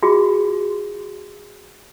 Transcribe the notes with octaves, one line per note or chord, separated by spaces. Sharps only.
F4 F#4 G#4